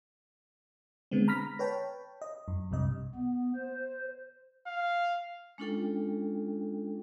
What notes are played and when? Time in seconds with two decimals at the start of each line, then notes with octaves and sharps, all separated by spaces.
1.11 D3 G#3 B3 C4
1.28 A#5 B5 F6 A#6 B6
1.59 B4 C#5 G5 A5
2.22 D#5
2.48 F#2
2.71 B1 G2 C3 D#5
3.15 B3
3.55 C5
4.67 F5
5.58 G#3 C#4 D4 F4 A4 G5